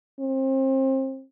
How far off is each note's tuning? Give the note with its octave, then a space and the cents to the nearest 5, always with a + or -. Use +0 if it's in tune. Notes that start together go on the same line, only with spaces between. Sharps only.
C4 +30